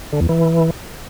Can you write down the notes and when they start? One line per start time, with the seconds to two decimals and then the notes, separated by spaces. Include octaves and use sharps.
0.13 D3
0.21 E2
0.29 E3